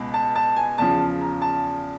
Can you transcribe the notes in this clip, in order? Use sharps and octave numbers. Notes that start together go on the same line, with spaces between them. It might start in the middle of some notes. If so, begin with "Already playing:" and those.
Already playing: C#2 B2
A5
A5
G#5
E2 C#3 F3 A5
A#5
A5